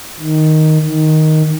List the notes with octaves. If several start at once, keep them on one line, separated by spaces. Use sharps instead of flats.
D#3
D#3